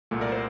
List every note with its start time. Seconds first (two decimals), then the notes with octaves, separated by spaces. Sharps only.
0.11 C2 A#2 A3
0.21 A#4 D5
0.32 C5